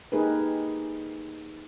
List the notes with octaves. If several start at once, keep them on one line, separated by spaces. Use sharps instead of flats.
A#3 D#4 G4 G#4 A#4 B4